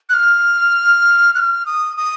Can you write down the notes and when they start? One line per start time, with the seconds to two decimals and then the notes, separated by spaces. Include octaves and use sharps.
0.09 F#6
0.14 F6
1.35 F#6
1.39 F6
1.66 D#6
1.97 D#6